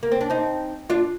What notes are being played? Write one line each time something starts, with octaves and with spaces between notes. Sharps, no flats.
A#3
C4
D4
C4 D#4
D4 F4